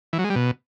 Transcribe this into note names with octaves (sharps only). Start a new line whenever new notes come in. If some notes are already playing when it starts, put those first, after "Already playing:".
E3
F#3
G#3
G3
B2